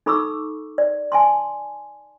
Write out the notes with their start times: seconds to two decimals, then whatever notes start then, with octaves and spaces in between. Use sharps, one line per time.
0.06 D#4 A4 B5 C#6 D6 E6
0.78 D5
1.12 G#5 A5 C6